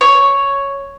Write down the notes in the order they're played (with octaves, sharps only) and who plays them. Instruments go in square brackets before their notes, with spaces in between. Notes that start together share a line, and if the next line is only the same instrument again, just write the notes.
[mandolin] C#5